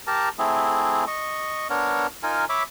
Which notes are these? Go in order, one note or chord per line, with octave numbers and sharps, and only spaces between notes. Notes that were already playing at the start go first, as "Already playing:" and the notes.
G4 A#4 A5 A#5
A3 C4 E4 G#4
D#5 C#6
B3 D4 A#4 C#5
D#4 F4 A#4 G#5
C#5 E5 B5 D6